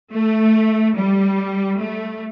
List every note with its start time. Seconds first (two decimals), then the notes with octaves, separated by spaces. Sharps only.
0.11 A3
0.95 G3
1.80 A3